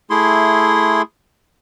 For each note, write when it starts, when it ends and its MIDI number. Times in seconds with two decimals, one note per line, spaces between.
0.10 1.02 57
0.10 1.02 64
0.10 1.02 68
0.10 1.02 84